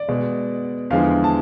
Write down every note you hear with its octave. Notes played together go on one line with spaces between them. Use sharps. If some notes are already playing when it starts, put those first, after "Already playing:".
Already playing: D5
B2 G#3
E2 D3 F3 G#3 F5
A5